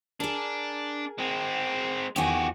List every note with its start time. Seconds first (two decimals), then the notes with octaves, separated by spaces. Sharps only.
0.20 D4 G#4 A#4
1.18 G#3 C4
2.16 E2 D#3 F#4 G4 G#5